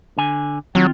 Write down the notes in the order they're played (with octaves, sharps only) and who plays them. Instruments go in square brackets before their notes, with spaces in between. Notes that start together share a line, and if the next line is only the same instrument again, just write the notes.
[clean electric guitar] D3 G#5
[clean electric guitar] D#3 C4 F4 [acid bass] F#3